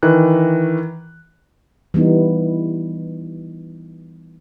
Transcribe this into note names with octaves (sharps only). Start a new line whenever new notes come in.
D#3 E3 F#6
E3 G3 B3 D#4